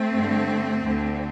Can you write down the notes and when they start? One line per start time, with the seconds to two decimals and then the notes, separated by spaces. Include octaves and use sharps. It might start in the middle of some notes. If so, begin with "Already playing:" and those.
Already playing: A3 C4
0.12 G2 D3
0.83 D2 D3